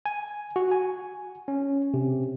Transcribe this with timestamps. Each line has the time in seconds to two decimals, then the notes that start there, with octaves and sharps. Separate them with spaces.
0.06 G#5
0.56 F#4
0.72 G#5
1.48 C#4
1.94 C3